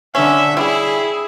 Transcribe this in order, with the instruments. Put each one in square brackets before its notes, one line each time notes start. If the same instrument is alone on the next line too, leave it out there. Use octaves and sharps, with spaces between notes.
[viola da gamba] D3 [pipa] C#4 [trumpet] E5
[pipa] G3 [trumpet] E4 [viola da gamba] G#4